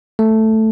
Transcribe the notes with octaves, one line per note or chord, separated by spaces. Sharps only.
A3